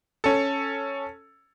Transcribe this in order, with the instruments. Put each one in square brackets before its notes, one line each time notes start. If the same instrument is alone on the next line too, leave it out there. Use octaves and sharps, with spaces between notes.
[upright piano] C#4 A4